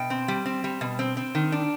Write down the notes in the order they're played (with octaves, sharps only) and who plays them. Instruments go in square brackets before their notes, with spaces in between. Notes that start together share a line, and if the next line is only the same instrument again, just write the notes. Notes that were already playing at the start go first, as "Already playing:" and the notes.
Already playing: [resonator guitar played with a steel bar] B2 G5
C4
G3
C4
G3
B2
C4
C4
D#3
D4